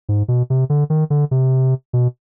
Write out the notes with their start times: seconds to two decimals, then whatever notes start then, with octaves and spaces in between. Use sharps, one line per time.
0.09 G#2
0.28 B2
0.50 C3
0.70 D3
0.90 D#3
1.10 D3
1.31 C3
1.93 B2